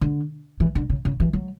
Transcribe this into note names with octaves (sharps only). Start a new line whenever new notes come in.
D3
E3
D3
C#3
C#3
E3
F#3